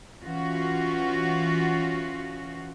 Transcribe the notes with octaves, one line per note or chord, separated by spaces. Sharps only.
E3 C#4 F4 F#4